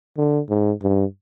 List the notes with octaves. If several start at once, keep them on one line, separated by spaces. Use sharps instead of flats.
D3
G#2
G2